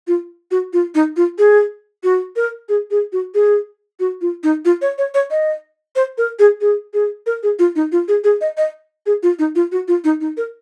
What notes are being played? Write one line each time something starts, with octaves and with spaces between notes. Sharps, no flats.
F4
F#4
F4
D#4
F4
G#4
F#4
A#4
G#4
G#4
F#4
G#4
F#4
F4
D#4
F4
C#5
C#5
C#5
D#5
C5
A#4
G#4
G#4
G#4
A#4
G#4
F4
D#4
F4
G#4
G#4
D#5
D#5
G#4
F4
D#4
F4
F#4
F4
D#4
D#4
A#4